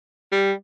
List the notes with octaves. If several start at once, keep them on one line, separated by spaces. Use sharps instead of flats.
G3